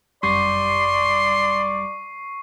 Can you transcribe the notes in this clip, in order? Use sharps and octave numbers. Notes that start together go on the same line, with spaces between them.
G1 F#2 G3 D5 C6 C#6 C7